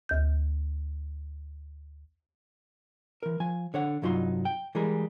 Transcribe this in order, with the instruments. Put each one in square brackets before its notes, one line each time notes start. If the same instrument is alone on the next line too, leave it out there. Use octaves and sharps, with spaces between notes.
[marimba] D2 G6
[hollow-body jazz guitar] E3 A#4
F3 G#5
D3 C#5 F#5
C2 G2 F#3 D#4 F4 C6
G5
E3 G3 G#3 G#4 A#4